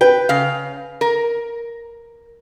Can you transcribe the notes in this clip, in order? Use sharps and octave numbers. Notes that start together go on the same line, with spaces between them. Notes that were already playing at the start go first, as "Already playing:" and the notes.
B4 G5
C#3 F5
A#4